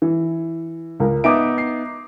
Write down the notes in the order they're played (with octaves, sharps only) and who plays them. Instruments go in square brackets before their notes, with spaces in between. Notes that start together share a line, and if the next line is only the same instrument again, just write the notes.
[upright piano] E3
C#2 A#4
[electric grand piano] B3 D#4 D7 [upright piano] E5 D6 D#6
[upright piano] C7